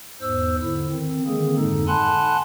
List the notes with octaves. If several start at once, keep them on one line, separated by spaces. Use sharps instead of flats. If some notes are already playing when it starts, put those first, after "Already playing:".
E2 G#2 C5 E6
D3 E4
D#3 C4
D3 D#3 G#3 A#3 C4 G#4
F2 G#2 D3 G#3 D#4 A4
F#5 G#5 A5 B5 C6 F#6